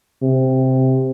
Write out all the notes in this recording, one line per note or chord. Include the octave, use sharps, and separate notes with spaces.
C3